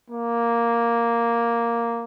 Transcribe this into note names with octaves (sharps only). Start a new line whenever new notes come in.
A#3